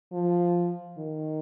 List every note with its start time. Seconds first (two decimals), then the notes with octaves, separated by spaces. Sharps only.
0.12 F3
0.98 D#3